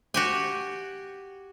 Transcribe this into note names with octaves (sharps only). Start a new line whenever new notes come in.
F#4 G4 G#5